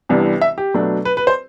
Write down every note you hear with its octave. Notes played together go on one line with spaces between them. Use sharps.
C2 C3 E3 B3 D4
E5
G4
B2 F#3 A3 D4
B4
B4
C5